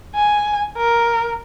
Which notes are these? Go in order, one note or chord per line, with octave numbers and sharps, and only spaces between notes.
G#5
A#4